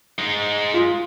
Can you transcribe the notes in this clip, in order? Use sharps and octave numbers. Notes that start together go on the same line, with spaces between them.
G#3 D#4
F4